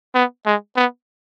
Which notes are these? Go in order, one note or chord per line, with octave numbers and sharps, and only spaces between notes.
B3
G#3
B3